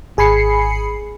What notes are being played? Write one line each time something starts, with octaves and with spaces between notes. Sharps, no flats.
G#1 G#4 G#5 B5 C7 C#7